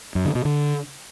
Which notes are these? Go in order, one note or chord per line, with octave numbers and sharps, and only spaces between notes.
F#2
D3
B2
D3